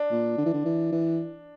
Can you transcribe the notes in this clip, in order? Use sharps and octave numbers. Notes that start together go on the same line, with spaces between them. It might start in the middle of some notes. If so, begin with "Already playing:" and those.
Already playing: D4
A#2
D3
E3
D3
E3
E3